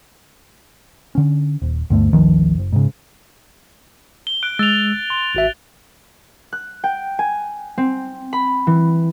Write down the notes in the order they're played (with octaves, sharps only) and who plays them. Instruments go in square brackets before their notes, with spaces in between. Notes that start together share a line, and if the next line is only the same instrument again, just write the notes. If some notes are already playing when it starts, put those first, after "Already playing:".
[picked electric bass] D3 C#4
D#1
D2 G2 A3
G#1 D2 D#3 F3
F#1
G#2 C#3
[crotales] G7
F#6 D7
[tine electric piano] G#3 E6 [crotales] A6 F7
[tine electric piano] C6
G#1 F#4 E5
[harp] F#6
G5
G#5
C4
B5
E3